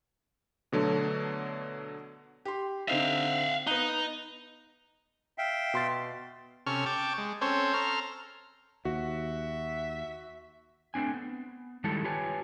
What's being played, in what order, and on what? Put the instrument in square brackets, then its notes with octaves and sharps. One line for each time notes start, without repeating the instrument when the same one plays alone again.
[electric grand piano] B2 D3 F#3 A3 D4
[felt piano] G4 C6
[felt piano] D3 C4 D#4 [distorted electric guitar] E5 F5
[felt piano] B3 F#6 [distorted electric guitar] D#4
[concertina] E5 F5 G5
[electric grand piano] B2 C6 A6
[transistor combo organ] C3 C#4 A4 C#6 F6
G5 A5 C#6 D6
G#3
C4 C#4 A4 C5 C#5
A4 A#5 C6 F6
[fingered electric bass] D#2 [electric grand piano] F#4 [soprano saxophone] E5
[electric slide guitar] A3 C4 D4 G#5
B3
D#3 G3 G#3 E4 A4 A5
F4 G4 B4 C#5 G#5 A5